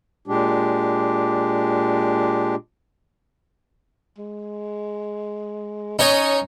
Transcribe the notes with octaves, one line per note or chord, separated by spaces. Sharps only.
A#2 G#3 D4 G4
G#3
C#4 D#4 C#5 D#5